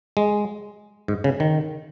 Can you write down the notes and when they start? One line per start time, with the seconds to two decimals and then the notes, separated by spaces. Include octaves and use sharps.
0.17 G#3
1.08 G#2
1.24 C#3
1.40 D#3